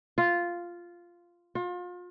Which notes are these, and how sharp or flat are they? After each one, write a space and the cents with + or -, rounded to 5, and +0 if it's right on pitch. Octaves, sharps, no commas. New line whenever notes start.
F4 -5
F4 +35